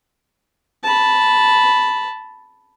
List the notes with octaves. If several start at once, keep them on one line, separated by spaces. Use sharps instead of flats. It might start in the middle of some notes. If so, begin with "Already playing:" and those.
A5 B5